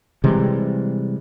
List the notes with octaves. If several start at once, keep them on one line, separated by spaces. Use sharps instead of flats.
C3 E3 G3 G#3